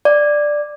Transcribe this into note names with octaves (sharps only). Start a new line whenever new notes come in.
D5